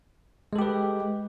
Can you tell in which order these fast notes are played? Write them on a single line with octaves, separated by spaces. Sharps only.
G#3 A4 G4 B4